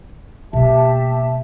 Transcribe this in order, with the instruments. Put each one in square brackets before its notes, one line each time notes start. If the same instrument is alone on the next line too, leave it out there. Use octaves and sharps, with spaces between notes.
[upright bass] B2 A#3 [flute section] G4 E5 A5